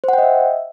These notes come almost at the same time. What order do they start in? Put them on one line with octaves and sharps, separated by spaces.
C5 F#5 G5 D#5 E5